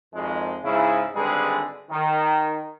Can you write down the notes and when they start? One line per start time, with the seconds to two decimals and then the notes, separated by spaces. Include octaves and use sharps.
0.14 G#1 F2 G#3
0.64 G#2 C#3 E4
1.15 G#1 D3 G3 G#3 G#4 B4
1.90 D#3